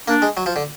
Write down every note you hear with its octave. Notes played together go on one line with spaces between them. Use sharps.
A#3 D4
G#3
F#3
F3
D3